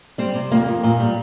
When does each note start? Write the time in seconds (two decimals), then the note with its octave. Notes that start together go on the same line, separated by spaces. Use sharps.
0.18 G3 C4
0.35 C3
0.51 F2 A#3
0.67 F2
0.83 A#2
1.00 G3